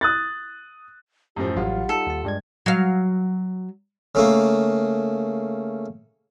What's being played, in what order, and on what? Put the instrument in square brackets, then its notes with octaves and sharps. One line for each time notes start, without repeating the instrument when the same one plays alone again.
[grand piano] D#6 F#6 A6
[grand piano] F#2 A2 F3 [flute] G4
[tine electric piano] A1 F#3 F5 [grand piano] G3 F4 [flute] F#5
[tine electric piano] D#4 [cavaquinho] A4
[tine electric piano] D#2 A5
[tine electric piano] G2 G#3 G#6 [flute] D5
[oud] F#3 F5
[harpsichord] C#3 A3 A#3